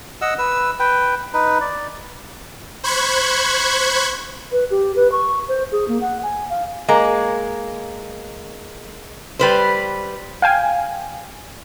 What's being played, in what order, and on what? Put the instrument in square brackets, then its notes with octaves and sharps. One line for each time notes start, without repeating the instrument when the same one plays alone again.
[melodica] D#5 F#5 E6
B4 E6
B4 G5
D#4 B4
D5
[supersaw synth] C5 B5 C#6 F#6 G#6
[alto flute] B4
G4
B4
C#6
C5
G#4
A#3
F#5
G#5
F5
[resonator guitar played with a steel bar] G#3 A#3
G3 B4 C5
[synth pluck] F5 G5 G#5